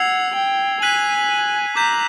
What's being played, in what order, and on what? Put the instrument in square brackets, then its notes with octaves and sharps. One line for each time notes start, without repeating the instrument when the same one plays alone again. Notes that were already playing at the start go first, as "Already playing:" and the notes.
Already playing: [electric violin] F#5 [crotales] E6 G#6 C7 F7
[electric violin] G5
[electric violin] G#5 [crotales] F#6 B6 D#7 F#7
[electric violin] A#5 [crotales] D6 G6 B6 E7